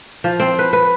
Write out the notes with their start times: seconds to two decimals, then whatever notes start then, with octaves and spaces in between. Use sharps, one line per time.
0.24 F3
0.40 C4
0.59 B4
0.73 B4